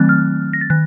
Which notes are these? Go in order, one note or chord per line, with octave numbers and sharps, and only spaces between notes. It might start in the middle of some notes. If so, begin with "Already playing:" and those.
Already playing: D#3 F#3 A3 C4 F#6 A6
F6
A#6
A6
D#3 F#6